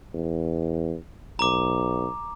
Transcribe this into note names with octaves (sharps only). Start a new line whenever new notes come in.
E2
B1 A#5 D6